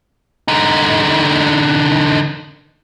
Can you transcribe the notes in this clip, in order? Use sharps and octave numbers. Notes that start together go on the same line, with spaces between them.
D3 D#4